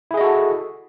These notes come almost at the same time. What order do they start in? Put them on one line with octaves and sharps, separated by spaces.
E4 G#4 D#5 F#4 A4